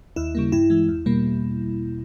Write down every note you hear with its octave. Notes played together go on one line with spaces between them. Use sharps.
D#2 E4
C#3 G3 A#3
G2 E4
E3 G#3
E2
B2 G3 A#3